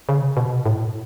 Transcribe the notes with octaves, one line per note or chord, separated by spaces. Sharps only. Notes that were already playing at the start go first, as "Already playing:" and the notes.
C#3
B2
A2